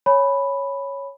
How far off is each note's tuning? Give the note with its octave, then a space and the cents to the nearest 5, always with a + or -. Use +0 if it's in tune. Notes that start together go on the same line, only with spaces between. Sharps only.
C#5 +0 G#5 +10 B5 +0